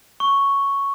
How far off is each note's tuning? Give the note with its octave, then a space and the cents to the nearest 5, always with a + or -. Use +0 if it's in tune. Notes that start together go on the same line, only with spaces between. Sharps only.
C#6 +0